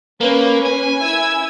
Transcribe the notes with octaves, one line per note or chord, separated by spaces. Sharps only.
A#3 C#4 B4
G#5
E4 E6 G#6